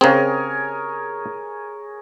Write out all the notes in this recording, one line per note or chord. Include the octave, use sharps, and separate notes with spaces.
C#3 C4 G#4 A#4 C#5